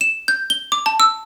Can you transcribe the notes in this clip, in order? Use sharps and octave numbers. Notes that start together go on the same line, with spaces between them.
E7
G6
G7
D6
A5
E6